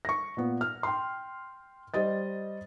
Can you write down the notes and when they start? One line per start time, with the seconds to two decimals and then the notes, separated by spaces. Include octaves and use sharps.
0.05 C#6 A#6
0.37 A#2 B3
0.61 F6
0.83 G5 C6
1.94 G3 C5 D#5 A6